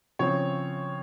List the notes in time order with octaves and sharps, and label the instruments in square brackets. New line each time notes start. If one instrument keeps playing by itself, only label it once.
[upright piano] C#3 F3 C4 C#5